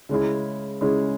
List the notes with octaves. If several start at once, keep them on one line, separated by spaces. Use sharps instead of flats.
C#3 G#3 C#4 E4
C#3 G#3 C#4 E4